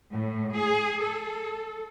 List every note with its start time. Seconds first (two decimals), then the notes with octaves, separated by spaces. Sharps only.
0.12 A2
0.55 G#4
1.03 A4